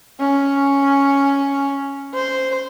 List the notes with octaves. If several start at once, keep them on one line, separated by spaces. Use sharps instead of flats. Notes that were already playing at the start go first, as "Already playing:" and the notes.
C#4
C5